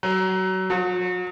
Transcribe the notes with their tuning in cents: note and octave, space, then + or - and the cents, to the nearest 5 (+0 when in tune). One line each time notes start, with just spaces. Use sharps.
F#3 +25
F#3 -40